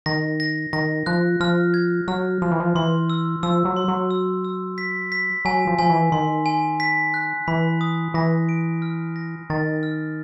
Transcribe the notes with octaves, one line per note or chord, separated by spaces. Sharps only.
D#3 A#6
A#6
D#3 A#6
F3 F#6
F3 F6
G#6
F#3 F6
F3 F6
E3
F3
E3 C6
E6
F3 E6
F#3
C6
F#3
E6
E6
B6
B6
F#3 G#5
F3
F3 G#5
E3
D#3 C6
G#5
B6
F#6
E3 B5
D#6
E3 A#6
D7
F6
A#6
D#3 A6
F6